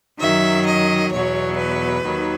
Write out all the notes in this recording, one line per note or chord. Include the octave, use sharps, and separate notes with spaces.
F#2 D#3 F#3 E5
D#5
E2 B2 F#3 C#5
B4
D#2 D#3 F#3